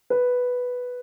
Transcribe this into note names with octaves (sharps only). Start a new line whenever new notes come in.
B4